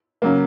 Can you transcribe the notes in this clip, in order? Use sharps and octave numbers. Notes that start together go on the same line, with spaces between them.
C#3 F#3 A#3